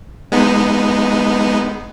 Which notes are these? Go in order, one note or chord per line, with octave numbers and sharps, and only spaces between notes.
G#3 B3 D#4